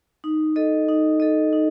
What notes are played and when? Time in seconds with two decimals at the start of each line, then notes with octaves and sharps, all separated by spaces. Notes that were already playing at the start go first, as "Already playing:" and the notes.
0.24 D#4
0.56 A4 D#5
0.88 D#4
1.20 A4 D#5
1.53 D#4